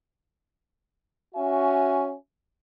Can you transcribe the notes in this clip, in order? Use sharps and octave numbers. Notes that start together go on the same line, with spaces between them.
C#4 F#4 E5 G#5